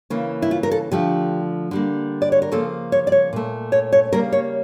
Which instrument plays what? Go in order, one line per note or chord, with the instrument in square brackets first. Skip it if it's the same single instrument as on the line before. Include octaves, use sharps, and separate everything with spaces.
[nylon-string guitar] C#3 E3 A#3
E4
F4
A#4
A4
D3 F3 A3 G4
D3 G3 A#3
D5
C#5
A#4
C#3 F3 A#3 A4
C#5
D5
C#5
A#2 A3
C#5
C#5
C#3 G3 A#3 A#4
C#5